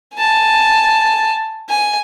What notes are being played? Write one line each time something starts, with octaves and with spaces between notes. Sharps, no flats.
G#5 A5
G#5